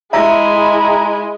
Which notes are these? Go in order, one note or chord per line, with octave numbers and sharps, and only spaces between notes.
G#3 E4 G#4 E5 A#5